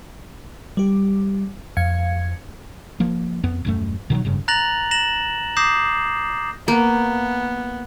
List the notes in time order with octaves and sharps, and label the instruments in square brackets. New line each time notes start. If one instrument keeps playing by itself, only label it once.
[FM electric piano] G3 G4
F2 F5 G#6 C#7
[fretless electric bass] F3 A#3
F2 B3
D#1 F#2 A3
B2 D#3 E3 F#3
F1 G2 C#3
[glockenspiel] A#5 F#6 A6 A#6 F7 F#7
A#6 E7 F#7
D6 D#6 G6 A#6 C7 E7
[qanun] A#3 [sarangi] B3